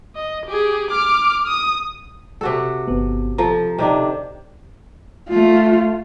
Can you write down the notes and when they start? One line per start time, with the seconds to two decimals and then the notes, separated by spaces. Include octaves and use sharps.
0.16 D#5
0.46 G4 G#4
0.91 D6 F6
1.48 D#6
2.41 C3 F#4 A4
2.88 G1 B3
3.38 F3 A4 A#5
3.79 C3 D#3 D4
5.29 A3 F4